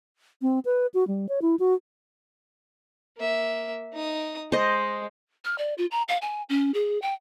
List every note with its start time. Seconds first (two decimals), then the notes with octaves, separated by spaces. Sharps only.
0.42 C4
0.65 B4
0.94 F#4
1.08 G3
1.29 C#5
1.42 E4
1.59 F#4
3.17 A#3 E5
3.93 D#4 D#6
4.52 G#3 C5 D#5
5.44 F6
5.58 D5
5.78 F4
5.91 A#5
6.08 F5
6.22 G#5
6.49 C#4
6.74 G#4
7.02 G5